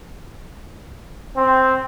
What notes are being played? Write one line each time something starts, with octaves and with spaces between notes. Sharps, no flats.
C4